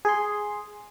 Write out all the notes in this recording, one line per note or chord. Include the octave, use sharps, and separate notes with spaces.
G#4 C6